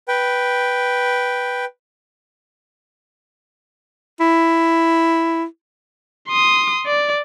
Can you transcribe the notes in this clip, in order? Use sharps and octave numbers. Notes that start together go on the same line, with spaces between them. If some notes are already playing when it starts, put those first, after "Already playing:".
B4 G5
E4
C6 D#6
D5